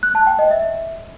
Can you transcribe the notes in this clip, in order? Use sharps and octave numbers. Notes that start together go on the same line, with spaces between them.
F#6
A5
G5
D#5
E5